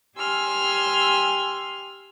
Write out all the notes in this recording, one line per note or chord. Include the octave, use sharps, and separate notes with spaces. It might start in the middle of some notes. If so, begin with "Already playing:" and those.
G4 G#5 C6 E6 F6